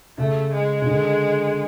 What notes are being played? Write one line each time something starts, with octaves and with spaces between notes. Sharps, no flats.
C#3 A3
G#3
C#3
D3